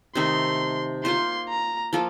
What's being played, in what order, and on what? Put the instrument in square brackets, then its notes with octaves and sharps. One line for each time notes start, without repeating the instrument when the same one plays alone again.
[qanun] C3 D#3 A3 D#4 [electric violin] C6
[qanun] A#3 F4 C5 [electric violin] C6
[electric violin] A#5
[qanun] F3 A#3 F4 A4